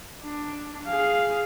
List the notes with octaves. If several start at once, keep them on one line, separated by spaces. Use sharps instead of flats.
D4
G#4 F5